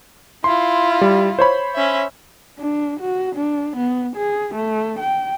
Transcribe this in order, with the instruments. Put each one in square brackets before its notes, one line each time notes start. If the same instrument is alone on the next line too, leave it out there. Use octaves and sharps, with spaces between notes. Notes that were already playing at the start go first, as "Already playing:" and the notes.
[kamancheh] E4 F4 [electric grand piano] C6
[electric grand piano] G3
C5 C#5 B5
[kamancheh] C#4 E5
[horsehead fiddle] D4
F#4
D4
B3
G#4
A3
G5